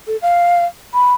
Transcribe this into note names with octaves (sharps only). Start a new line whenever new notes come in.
A4
F5
B5